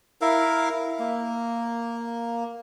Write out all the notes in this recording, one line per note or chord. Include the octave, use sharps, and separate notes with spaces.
E4 A#4 E5 F5
A#3